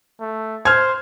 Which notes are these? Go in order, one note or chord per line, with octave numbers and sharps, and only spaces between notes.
A3
C5 F6 G#6